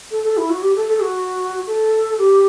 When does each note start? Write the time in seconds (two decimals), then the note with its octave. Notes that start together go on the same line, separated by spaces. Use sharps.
0.11 A4
0.24 A4
0.37 E4
0.50 F#4
0.62 G4
0.76 A4
0.89 A4
1.02 F#4
1.67 A4
2.18 G4